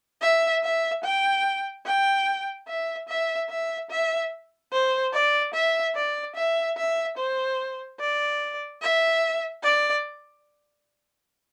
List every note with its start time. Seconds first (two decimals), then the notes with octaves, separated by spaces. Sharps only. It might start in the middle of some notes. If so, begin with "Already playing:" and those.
0.22 E5
0.63 E5
1.04 G5
1.86 G5
2.68 E5
3.09 E5
3.49 E5
3.90 E5
4.72 C5
5.13 D5
5.54 E5
5.95 D5
6.36 E5
6.77 E5
7.18 C5
8.00 D5
8.82 E5
9.63 D5